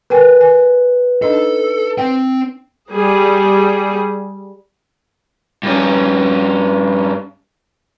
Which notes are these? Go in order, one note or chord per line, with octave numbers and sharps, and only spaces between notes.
A#4 B4 G5 G#5
G#5
D4 D#4 A4 D#5
C4 G5
G3 G#4
G2 C#4